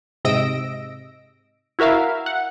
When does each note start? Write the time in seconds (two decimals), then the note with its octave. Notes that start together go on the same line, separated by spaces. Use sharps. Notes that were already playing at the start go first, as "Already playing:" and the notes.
0.25 G#2 C3 D#5 E6 A#6 D7
1.79 E4 F#4 A#4 E5 F5
2.26 F#5